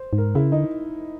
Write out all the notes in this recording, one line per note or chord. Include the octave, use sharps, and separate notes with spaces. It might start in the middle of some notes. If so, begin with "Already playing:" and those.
Already playing: C5
G#2
A#4
C#3 E4
D3 D#4